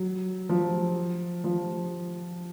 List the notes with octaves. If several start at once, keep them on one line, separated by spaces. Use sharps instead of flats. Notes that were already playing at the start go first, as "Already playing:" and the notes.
Already playing: F#3
F3
F3